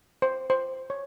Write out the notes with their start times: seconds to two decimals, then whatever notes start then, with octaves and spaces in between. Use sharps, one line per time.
0.22 C5
0.50 C5
0.90 C#5